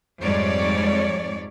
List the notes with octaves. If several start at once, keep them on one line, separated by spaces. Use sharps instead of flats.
F2 G#2 G3 G#3 C#5 D5